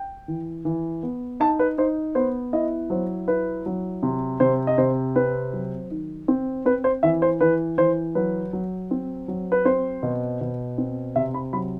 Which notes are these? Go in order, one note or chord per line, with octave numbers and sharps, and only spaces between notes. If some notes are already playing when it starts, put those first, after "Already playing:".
Already playing: G5
E3
E3
B3
D#4 A5
B4
D#4 C5
B3 C5
E4 D#5
F#3 C5
E4 B4
F#3
C3
C3 C5
D#5
C3 C5
C4 B4
F#3
D#3
C4
C4 B4
C5
E3 E5
C5
E3 B4
E3 C5
F#3 B4
F#3
C4
F#3
B4
C4 C5
B2
B2
C4
C3 E5
B5
F#3 B5